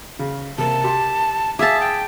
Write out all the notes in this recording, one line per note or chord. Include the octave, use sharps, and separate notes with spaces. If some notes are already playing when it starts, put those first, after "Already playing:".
C#3
C3 A#3 A5
G4 C6
G#4 E5 F5 A5 D6
G5